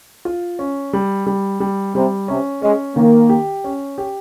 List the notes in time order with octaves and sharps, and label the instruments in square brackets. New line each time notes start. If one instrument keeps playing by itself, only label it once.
[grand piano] F4
C#4
G3
G3
G3
[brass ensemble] C3 [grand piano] G3
[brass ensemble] C3 [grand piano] C#4
[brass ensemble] G#3 [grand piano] C#4
[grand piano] D#3 [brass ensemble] A#3
[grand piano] G4
C#4
G4